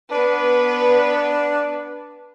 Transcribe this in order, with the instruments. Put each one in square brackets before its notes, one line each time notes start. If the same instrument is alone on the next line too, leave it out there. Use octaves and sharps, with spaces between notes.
[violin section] B3 B4 [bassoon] D4